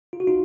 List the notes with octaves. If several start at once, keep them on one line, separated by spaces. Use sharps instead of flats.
F4
F#4
D#4 F4